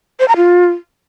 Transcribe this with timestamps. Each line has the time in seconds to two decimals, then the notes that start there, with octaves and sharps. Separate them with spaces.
0.20 C5
0.28 A#5
0.37 F4